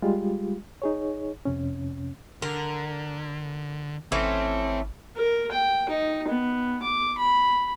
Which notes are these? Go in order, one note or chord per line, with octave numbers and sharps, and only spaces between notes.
G3 G#3 F4 G4
D#4 G#4 C#5
F2 C3 C#4
D3 A#4
G#1 E3 A3 C4 C#4
A#4
G5
D#4
B3
D6
B5